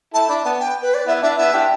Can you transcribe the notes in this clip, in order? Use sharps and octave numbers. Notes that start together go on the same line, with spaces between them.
E4 A4 A5
D4 B5
B3 A5
G5
B4
D5
B3 E4 E5
D4 E5
B3 E4 E5
D4 G4